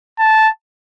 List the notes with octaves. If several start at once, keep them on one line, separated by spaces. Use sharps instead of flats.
A5